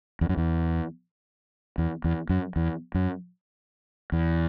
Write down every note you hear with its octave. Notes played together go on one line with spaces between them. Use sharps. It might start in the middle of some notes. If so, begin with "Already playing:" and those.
E2
F#2
E2
E2
E2
F#2
E2
F#2
E2